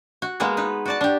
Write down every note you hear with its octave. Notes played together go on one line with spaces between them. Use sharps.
F#4
G#3 A#3 B3 G#4
D#4 B4
F#4 D5 A5
D4 G4